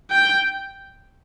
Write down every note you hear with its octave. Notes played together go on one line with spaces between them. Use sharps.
G5